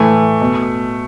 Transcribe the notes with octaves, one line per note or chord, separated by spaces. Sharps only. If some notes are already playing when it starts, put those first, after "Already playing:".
Already playing: A2 E3 A3
B2